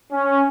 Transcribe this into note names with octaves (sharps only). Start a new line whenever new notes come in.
C#4